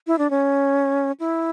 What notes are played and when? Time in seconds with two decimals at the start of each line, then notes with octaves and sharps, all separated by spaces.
0.07 E4
0.18 D4
0.30 C#4
1.20 E4